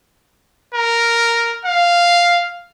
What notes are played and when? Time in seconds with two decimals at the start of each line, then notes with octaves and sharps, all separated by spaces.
0.74 A#4
1.65 F5